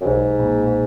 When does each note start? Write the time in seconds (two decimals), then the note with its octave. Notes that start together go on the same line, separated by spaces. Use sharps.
0.01 F#2
0.05 B1 G#2
0.39 A#2